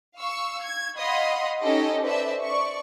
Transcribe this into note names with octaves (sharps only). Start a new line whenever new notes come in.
F5 C#6 E6
G#6
D#5 F5 F#5 B5 C6 D#6
C#4 D#4 G4 A4 D#5
B4 C5 D5 E5 A5
D5 C#6